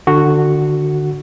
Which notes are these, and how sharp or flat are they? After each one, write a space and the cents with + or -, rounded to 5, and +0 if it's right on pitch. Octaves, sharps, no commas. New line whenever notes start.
D3 +25 F#4 +0